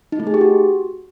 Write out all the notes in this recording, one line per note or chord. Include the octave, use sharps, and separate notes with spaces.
D#4
A3
G#4
G4
F#4